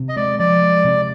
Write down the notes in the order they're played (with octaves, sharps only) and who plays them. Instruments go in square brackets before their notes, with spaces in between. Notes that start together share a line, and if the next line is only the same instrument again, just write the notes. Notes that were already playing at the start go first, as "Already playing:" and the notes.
Already playing: [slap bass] C3
[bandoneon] D#5
[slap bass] G#3 [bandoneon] D5
[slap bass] F3 [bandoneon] D5
[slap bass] G#3
C3